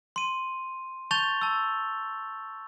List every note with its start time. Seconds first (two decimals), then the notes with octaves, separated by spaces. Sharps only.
0.16 C6 D#7
1.11 A5 C#6 G6 A6 F7 G7
1.42 A5 E6